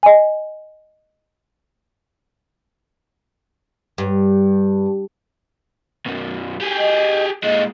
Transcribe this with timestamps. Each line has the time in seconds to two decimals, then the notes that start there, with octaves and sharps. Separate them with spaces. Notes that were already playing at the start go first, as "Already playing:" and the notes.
0.03 D#5 G#5
3.98 G2
6.06 B1 F#2
6.61 G4 G#4
6.78 D#5
7.43 A#2 G#3 D#5